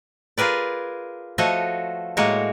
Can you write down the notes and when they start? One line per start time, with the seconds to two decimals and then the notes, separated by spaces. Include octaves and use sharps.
0.38 F4 G#4 A#4 B4 D5
1.38 F3 A3 F#4 A4 C#5 D#5
2.17 A2 G#3 A#3 F#4 A#4 C#5